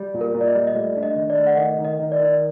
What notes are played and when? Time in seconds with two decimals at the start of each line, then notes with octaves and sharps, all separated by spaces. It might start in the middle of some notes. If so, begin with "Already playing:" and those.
Already playing: G3
0.14 A#2
0.21 A#4
0.34 A#2
0.41 D5
0.48 D#5
0.55 G3
0.67 D#5
0.75 A3 D5
0.97 D4
1.03 D#5
1.16 D#3
1.30 D5
1.37 A3
1.47 F#5
1.57 D#3 D#5
1.78 D#3
1.84 D#5
1.99 D#3
2.12 D5
2.20 D#3